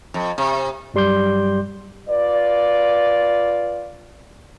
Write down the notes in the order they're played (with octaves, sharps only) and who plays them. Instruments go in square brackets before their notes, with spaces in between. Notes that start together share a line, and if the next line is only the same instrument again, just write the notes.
[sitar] F2
C3
[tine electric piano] G2 F#3 G3 C6 D6 G6
[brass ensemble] F4 B4 D5